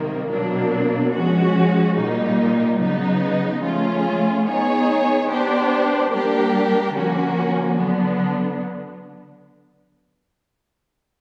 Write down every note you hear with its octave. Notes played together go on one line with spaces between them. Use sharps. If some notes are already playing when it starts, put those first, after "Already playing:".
Already playing: C3 D#3 G3 A#3
B2 F#3 A#3 D4
F3 G#3 C#4 F#4
A#2 G3 A#3 D#4
C#3 F#3 B3 D#4
F3 A3 C#4 F4 G#4
B3 D#4 G#4 C#5
B3 D4 G4 C5
G3 A#3 D4 G4 A#4
D3 F3 A#3 C#4 F#4
D3 F#3 B3 D4